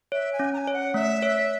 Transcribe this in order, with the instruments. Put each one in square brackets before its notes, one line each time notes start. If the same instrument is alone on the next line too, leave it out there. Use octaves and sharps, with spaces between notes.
[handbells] C#5 [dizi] E5
[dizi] G#5
[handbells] C#4
[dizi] A#5
G#5
[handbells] C#5
[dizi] F#5
[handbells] A3 [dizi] E5
[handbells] C#5